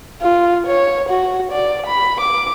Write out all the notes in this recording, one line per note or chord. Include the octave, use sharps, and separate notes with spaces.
F4
C#5
F#4
D5
B5
D6